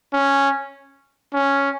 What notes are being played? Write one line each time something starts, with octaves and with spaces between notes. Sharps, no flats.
C#4
C#4